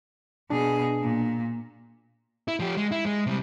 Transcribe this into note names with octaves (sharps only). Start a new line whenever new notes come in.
B2 D4 G#4
A#2
E4
F3 G4
G#3
E4
G#3
C3 G3